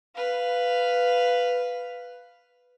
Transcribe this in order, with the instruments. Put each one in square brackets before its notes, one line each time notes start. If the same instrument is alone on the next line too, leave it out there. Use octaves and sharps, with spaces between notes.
[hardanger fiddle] B4 F5